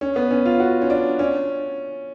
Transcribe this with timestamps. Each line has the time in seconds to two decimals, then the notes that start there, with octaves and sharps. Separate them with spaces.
0.01 C#4
0.16 B3
0.31 C#4
0.45 F4
0.60 F#4
0.82 C#4
0.90 D4
1.19 C#4